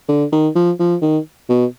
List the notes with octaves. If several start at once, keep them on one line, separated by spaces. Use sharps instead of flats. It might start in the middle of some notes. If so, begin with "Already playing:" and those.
D3
D#3
F3
F3
D#3
B2